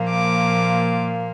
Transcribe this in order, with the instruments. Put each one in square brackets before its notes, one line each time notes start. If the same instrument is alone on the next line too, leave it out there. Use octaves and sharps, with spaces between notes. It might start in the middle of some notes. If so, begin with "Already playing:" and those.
Already playing: [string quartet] A#2 F3 A#3
D6